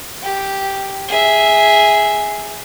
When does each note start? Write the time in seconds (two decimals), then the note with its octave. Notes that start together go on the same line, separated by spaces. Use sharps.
0.23 G4
1.09 G#4 E5